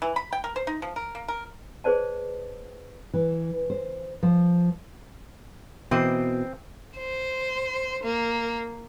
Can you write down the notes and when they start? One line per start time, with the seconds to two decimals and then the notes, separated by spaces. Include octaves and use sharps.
0.02 E3
0.16 B5
0.33 G5
0.44 A#4
0.56 C5
0.67 D#4
0.82 F3
0.96 A#4
1.15 A#3
1.28 A#4
1.84 G#4 B4 C5 D5 A5
3.14 E3
3.70 C5
4.23 F3
5.91 B2 E3 C4 A#4 C5 D#5
6.97 C5
8.03 A#3